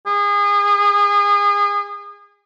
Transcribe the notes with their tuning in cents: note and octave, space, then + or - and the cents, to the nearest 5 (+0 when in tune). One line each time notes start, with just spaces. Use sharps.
G#4 -30